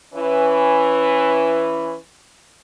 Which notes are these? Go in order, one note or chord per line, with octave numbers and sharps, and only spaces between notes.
E3 C#4 B4